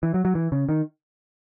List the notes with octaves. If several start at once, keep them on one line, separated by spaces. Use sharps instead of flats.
E3
F#3
F#3
E3
C#3
D#3